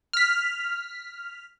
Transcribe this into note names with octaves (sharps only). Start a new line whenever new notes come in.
F6 B6